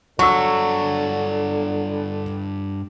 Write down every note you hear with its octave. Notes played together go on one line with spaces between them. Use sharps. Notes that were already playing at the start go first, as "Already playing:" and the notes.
G2 D3 F#3 A4 C#6 E6